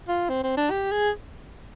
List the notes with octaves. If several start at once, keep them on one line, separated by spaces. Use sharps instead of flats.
F4
C4
C4
D4
G4
G#4